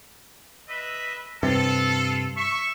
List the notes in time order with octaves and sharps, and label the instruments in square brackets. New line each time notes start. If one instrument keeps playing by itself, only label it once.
[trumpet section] B4 D#5 E5
[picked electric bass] G2 C3 [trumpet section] F4 A4
[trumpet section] E5 C#6